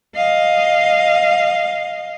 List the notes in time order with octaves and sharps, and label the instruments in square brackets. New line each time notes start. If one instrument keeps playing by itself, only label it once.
[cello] D#5 F5